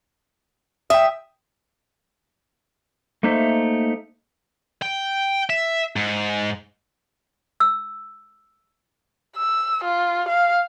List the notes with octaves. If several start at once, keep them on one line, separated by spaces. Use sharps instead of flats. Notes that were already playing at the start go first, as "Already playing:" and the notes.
E5 G5 D#6
A3 A#3 D#4 C5 E5
G5
E5
G#2
E6
E6
F4
F5